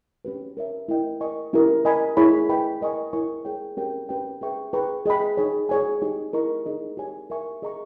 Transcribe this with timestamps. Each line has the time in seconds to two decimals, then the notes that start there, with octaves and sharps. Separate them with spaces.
0.25 C#4 G4 B4
0.57 A#4 C#5 E5
0.89 E4 A#4 D#5 G5
1.20 A#4 D#5 G#5 C#6
1.53 C#4 E4 G4 A#4
1.85 A#4 D#5 G#5 B5
2.17 E4 G#4 C#5 G#5 B5
2.49 B4 D#5 G5 B5
2.81 A#4 D#5 G#5 C#6
3.13 E4 A#4 C#5 G#5 C#6
3.45 G#4 C#5 G5
3.77 C#4 G4 A#4 C#5 G5
4.09 C#4 G4 B4 G5
4.41 G#4 B4 E5 G5 C#6
4.73 G#4 B4 G5 A#5 C#6
5.06 G#4 D#5 G5 B5
5.37 D#4 G#4 C#5
5.69 G#4 C#5 G#5
6.02 D#4 G4 C#5 G#5
6.33 E4 A#4 D#5 A#5 C#6
6.66 D#4 G#4 D#5
6.97 G4 C#5 G#5
7.30 A#4 E5 G#5 C#6
7.62 G#4 D#5 A#5 C#6